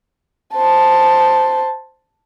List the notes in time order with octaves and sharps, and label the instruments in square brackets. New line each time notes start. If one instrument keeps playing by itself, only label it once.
[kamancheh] C5 A5